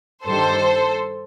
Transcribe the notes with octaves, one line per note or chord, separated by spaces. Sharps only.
G2 D#3 G3 A4 C5